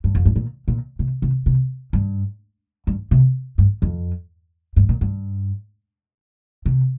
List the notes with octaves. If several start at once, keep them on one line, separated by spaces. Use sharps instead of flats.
G2
F2
G2
A#2
A#2
C3
C3
C3
G2
G2
C3
G2
F2
G2
A#2
G2
C3